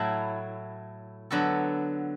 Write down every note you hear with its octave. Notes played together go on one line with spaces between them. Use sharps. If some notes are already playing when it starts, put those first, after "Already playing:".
Already playing: A2 F#3 A3 E4
D3 F#3 B3 F#4 A4